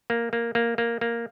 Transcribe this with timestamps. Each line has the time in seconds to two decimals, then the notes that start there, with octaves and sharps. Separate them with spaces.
0.10 A#3
0.33 A#3
0.55 A#3
0.78 A#3
1.01 A#3